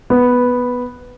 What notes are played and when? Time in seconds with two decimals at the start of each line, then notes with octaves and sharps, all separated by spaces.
0.10 B3